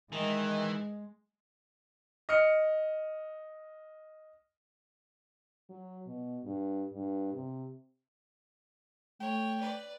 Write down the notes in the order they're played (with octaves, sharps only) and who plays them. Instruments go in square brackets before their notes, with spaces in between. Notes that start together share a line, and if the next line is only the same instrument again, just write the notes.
[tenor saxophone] D#3 [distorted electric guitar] E3 [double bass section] G#3
[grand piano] D#5 F6 C#7
[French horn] F#3
B2
G2
G2
C3
[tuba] A3 [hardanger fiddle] C#5 [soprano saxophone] G5
[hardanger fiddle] B4 D5